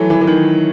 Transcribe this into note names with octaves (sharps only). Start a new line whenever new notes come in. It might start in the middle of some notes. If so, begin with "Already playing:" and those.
Already playing: E3 F#3 A3
E3
E3
D#3